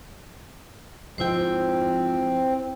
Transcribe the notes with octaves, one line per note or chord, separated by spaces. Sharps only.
G#2 F3 C4 E4 C5 G5